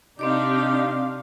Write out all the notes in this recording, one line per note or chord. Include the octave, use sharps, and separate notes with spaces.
C3 C4 D4 D#4 G4 D5 F5 D6